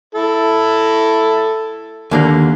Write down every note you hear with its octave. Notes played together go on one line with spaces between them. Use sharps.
E4 A4
D#2 D3 A#3